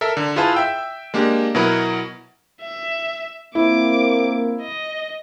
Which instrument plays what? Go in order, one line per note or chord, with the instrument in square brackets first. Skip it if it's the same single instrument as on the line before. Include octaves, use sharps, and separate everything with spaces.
[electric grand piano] A4 A#4 E5
D3
E4 F4 G#4 B4 F5 A5
E5 G5 E6
G#3 A#3 D4 G4
B2 F#3 E4 A#4 B4 A#5
[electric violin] E5
[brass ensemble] A#3 C4 [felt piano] E4 [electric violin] D6
[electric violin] D#5